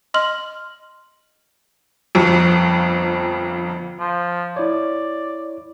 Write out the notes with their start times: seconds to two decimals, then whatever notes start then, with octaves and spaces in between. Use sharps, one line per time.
0.14 D#5 C6 F6 F#7
2.15 G1 F2
3.99 F3
4.56 E4 C#5 D5